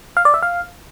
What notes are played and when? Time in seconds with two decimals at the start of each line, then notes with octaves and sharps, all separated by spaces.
0.17 F5
0.25 D5
0.34 E5
0.42 F5